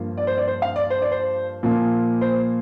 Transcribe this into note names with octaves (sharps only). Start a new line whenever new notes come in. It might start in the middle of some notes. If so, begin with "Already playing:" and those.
Already playing: G2 F3 A#3
D5
C5
D5
C5
F5
D5
C5
D5
C5
A#2 F3 A#3
C5